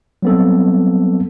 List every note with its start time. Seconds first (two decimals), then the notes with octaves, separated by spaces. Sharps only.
0.22 F#3 G3 B3 C4 A4